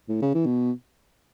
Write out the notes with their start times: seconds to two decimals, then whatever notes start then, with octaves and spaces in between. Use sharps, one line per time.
0.09 A2
0.22 C#3
0.34 E3
0.46 B2